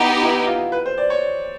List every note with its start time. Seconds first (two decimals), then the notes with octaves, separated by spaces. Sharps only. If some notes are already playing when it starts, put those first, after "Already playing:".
Already playing: B3 D#4 E4 G4
0.22 E4
0.47 F4
0.72 B4
0.86 C5
0.98 D5
1.10 C#5